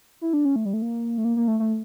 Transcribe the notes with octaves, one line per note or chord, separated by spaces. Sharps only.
E4
D4
C#4
A3
G3
A3
A#3
A3
A#3
A#3
A3
A3